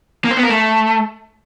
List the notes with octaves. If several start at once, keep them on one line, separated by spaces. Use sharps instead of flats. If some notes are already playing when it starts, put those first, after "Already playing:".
A#3
C5
B3
A#4
A3